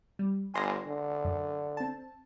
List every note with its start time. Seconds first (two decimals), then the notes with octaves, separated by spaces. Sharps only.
0.19 G3
0.54 G1 G#5 C6 A#6
0.87 D3
1.25 F#2
1.77 C4 A5